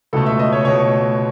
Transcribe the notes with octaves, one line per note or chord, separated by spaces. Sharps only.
C#2 B2 A3 A4
E5
D#5
C#5
B2 A3 C#5